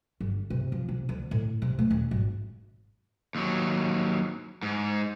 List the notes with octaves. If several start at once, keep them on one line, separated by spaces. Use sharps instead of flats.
G1
C3
F3
C3
D2
A2
C3
A3
D#1
G#1
D#2 F#3
G#2